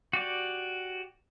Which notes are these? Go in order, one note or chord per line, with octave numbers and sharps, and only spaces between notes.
F#4 G4 D5